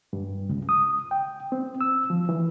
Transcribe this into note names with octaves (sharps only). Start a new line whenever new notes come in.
G2
C#2
D#6
G5
C4
E6
F3
E3